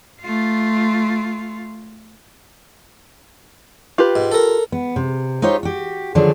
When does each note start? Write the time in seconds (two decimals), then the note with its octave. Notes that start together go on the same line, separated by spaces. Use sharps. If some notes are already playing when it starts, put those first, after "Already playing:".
0.22 A3 F4
3.98 F4 G4 B4
4.16 G#2
4.32 A4 A#4
4.72 B3
4.96 C3
5.42 D#4 F4 G4 C5 C#5
5.63 F#4 G4
6.15 D3 D#3 F3 F#3 D4 G#4